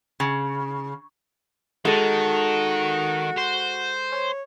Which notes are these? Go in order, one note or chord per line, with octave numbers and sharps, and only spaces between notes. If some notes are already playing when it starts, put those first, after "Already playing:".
C#3
D#3 G#3 F#4 A4
C5
C#5